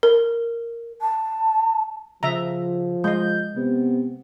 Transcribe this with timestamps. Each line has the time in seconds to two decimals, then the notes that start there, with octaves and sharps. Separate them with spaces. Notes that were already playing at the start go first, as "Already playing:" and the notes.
0.03 A#4
1.01 A5
2.23 C#3 F3 E5 A#5
3.04 G#3 D#5 G6
3.56 C3 B3